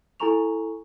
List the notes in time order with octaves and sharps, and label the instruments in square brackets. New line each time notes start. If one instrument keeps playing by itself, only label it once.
[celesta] E4 A4 G#5 A#5 C#6 F7